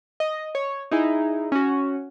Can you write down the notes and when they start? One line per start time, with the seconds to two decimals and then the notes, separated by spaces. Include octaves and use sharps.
0.20 D#5
0.55 C#5
0.91 D#4 E4 G#4
1.52 C#4 F#4